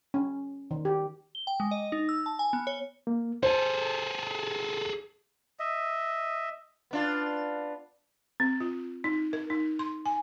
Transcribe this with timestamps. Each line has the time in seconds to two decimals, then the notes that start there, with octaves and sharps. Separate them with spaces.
0.14 C#4
0.71 D#3
0.85 G4
1.35 G7
1.47 G5
1.60 G#3
1.71 D#5
1.92 D#4
2.09 E6
2.26 A5
2.39 G#5
2.53 B3
2.67 C#5
3.07 A#3
3.43 G#4 A4 C5
5.59 D#5 E5
6.91 B3 D4 F4
8.40 C4
8.60 F4
9.04 D#4
9.33 A#4
9.50 D#4
9.79 C6
10.05 G#5